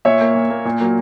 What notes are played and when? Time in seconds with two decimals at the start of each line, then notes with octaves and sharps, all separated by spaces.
0.05 A#2 C#5 E5
0.21 A#3
0.35 A#2
0.50 A#3
0.65 A#2
0.80 F#3 A#3